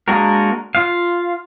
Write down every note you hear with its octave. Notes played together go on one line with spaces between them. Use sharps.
G#3 A#3 D4 F#4 A#4
F4 F5